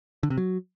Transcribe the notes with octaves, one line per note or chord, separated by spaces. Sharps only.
D3
C3
F#3